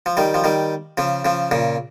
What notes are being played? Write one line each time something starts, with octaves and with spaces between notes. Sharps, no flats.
F3
D#3 G3
F3
D#3 G3
C#3 F3
C#3 F3
A#2 C#3